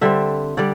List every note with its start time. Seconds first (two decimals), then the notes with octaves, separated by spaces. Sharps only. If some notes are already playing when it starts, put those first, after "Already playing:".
0.01 D3 G3 C4 E5
0.57 D3 G3 D5